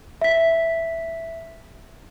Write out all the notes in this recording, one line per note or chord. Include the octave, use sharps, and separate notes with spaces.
E5 B6